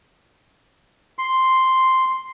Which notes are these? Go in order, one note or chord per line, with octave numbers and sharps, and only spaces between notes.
C6